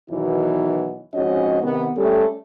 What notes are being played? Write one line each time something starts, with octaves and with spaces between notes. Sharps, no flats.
E2 B2 D#3 E3 F#3 D#4
F2 G#2 C#4 F#4 C#5 D#5
C3 D#3 B3
G3 A3 C#4 G4 A4